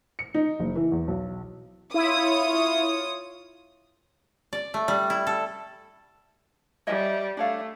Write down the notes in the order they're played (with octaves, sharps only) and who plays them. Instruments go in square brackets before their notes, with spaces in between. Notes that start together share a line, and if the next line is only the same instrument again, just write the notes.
[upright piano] C#7
D#4
F#1
E3
E2
B1
[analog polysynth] E4 [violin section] F4 C#5 D#6
[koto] D5
A3
G3
E4
A4
[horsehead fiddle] G3 [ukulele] C#5 D#5 E5
[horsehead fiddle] A3 [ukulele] D4 C#5 F5